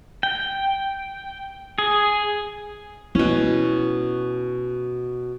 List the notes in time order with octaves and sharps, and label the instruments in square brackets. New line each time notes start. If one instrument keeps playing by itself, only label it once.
[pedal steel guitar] G5
G#4
[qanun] B2 C#4 [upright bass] E4